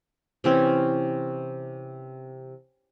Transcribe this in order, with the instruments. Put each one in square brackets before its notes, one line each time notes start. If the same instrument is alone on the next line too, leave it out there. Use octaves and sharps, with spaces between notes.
[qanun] C3 E3 C4 C#4